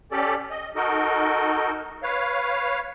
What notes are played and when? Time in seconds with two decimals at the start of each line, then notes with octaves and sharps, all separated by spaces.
0.12 C#4 G4 A4 D5
0.51 D#5
0.76 D#4 F#4 A4 A#4 D#5
2.03 B4 C#5 F5